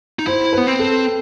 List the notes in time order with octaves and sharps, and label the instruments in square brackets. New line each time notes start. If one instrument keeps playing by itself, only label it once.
[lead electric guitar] D#4
[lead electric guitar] E4 [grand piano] C5
[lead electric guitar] B3 [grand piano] B4
[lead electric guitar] C4
[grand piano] A4